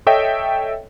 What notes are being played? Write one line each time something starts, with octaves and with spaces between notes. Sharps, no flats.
A4 C#5 D#5 E5 G5